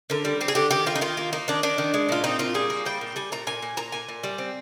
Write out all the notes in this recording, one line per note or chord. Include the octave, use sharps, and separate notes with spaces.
D3 A#4
G3
C4 G4
G#4
D3 G4
D#3 G4
A#3 F4
D#4
D#3 F4
A#3
A#3 D#4
D#3 D4
D#3 D4
D#3
G#3
A#2 F4
C4 D#4
A#2 F4
G3 G#4
A#3
G3 G5
A#2
G3 G#5
A#2 A#5
A#2 G#5
A#2
A#2 A#5
A#2 G#5
A#2
G3
C4